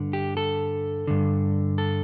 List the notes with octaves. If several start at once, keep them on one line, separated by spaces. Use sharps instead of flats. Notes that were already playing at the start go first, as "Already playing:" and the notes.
Already playing: G2 D3
G4
A4
G2 D3
A4